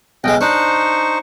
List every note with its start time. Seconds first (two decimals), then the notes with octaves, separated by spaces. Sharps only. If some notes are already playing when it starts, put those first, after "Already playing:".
0.24 B1 G#3 D#5 G5
0.41 D4 D#4 C5 C#6